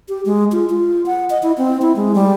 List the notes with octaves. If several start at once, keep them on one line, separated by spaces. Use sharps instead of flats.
G4
G#3
F4
F4
F#5
D#5
E4
C4
E4
G#3
G3